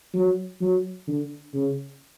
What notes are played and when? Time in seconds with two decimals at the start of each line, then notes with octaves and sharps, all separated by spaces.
0.14 F#3
0.61 F#3
1.07 D3
1.53 C#3